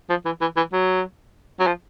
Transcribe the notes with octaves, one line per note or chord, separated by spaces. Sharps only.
F3
E3
E3
E3
F#3
F#3
F3